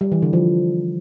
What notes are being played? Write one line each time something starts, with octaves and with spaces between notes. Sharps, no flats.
G3
E3
D3
F3